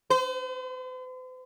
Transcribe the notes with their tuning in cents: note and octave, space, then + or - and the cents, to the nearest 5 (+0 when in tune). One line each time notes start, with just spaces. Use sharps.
C5 -45